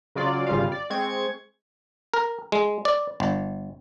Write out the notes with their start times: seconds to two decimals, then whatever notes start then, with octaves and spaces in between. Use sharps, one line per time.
0.15 C#3 F#3 F4 D5
0.47 G#1 C#3 G3 F4 F5
0.72 D5
0.90 G#3 C4 C#6 G#6
2.14 A#4
2.52 G#3
2.85 D5
3.20 G1